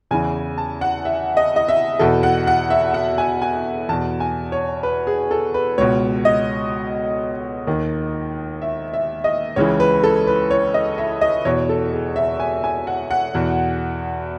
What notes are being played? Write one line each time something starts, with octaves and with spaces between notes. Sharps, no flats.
E2 C#3 E3 G#5
A5
F#5
E5
D#5
D#5
E5
E2 B2 A4
F#5
F#5
E5
F#5
G#5
G#5
E2 B2 A5
G#5
C#5
B4
G#4
A4
B4
C#2 B2 C#5
D#5
D#2 D#3
E5
E5
D#5
C#2 C#3 E3 C#5
B4
A4
B4
C#5
D#5
E5
D#5
E2 B2 C#5
A4
G#4
E5
G#5
G#5
F#5
F#5
E2 B2